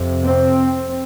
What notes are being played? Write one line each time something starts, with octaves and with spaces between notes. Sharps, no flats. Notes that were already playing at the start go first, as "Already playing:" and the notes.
Already playing: F2 C3
C4